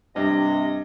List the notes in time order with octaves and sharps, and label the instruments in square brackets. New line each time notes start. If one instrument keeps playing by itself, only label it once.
[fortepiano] G2 [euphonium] C3 [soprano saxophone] D#5